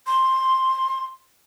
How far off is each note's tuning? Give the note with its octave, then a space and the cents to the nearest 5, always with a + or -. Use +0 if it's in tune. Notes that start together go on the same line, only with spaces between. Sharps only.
C6 +10